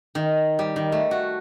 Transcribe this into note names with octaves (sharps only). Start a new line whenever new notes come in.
D#3
G3
D#3
A3
F#4